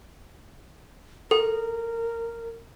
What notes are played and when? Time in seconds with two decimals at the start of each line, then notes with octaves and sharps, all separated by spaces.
1.31 A4 A#4